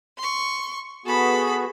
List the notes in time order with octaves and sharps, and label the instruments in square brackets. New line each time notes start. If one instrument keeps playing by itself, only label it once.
[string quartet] C6 C#6
[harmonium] B3 F#4 G#4 [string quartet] A4 B5